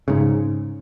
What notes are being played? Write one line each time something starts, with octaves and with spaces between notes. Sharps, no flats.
G#2 C#3